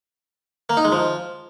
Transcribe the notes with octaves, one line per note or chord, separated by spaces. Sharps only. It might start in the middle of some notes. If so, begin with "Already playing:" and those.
A#3
D#4
G#3
F3